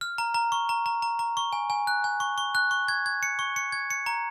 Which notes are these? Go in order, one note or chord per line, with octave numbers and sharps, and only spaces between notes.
F6
A#5
A#5
C#6
A#5
A#5
A#5
A#5
C#6
G#5
G#5
F#6
G#5
C#6
C#6
F#6
C#6
G#6
G#6
C#7
C#6
C#7
G#6
C#7
A#5